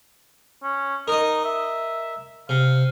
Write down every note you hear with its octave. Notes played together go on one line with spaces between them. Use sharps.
C#4
D#4 A#4 D#5
E5
C3 F5